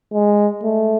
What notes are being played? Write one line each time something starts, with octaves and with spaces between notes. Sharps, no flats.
G#3
A3